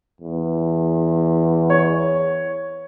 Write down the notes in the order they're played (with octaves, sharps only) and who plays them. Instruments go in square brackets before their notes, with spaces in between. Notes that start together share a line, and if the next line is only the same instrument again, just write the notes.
[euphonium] E2
[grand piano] C#5